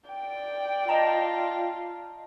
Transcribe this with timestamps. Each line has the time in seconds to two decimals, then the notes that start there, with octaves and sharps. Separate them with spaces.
0.10 D5 G5
0.89 F4 D#5 A5 A#5